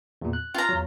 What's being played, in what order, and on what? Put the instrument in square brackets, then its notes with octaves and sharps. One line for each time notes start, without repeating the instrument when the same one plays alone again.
[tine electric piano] E2 A#2
F#6
[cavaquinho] F4 A#5
[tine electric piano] E2 F#3